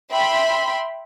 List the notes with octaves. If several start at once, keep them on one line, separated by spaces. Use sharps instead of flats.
E5 G5 B5 C6